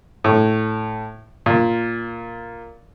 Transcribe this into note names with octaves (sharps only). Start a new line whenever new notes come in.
A2
A#2